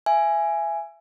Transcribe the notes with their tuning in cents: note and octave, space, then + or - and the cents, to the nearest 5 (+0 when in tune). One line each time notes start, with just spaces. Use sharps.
E5 +25 G#5 +0